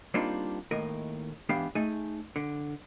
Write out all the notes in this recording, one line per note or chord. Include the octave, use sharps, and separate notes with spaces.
G3 A#3 C4 D4 D#4 F4
D#2 A2 A#4 D#5
G#2 E3 B3 D4 G4 F5
A3 D#4 G#4 G#5
D3